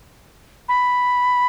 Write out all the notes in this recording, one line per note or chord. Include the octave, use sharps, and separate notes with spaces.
B5